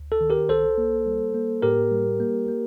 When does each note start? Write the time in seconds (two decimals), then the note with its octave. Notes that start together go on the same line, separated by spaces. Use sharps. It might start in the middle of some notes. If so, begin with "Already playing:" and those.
Already playing: D2
0.12 A4
0.21 D#3
0.30 G4 A#4
0.49 C2 A4 C5
0.78 A#3
1.06 G3
1.34 A#3
1.63 A2 G4 A#4
1.91 G3
2.20 A#3
2.48 A#3